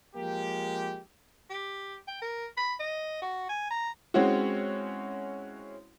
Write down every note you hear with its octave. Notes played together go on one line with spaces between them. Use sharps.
F3 G#3 A#3 G4
G4
G5
A#4
B5
D#5
F#4
G#5
A#5
G#3 C4 C#4 E4 F#4